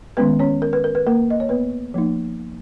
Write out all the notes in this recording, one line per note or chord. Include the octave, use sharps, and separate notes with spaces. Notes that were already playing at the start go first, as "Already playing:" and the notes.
D#3 G#3 B3 C#4 B4
C#4 C#5
A#4
B4
A#4
B4
A#3 A#4
D#5
C#5
B3 B4
F3 A#3 D#4